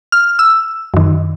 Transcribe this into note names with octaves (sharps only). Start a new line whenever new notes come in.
F6
E6
F#2 D#3